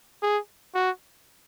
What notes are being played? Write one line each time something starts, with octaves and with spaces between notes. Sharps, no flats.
G#4
F#4